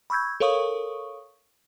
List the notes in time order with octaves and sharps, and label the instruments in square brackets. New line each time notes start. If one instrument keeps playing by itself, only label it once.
[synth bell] B5 C#6 E6 G6 G#6
A4 A#4 C#5 F5 C#6 D#6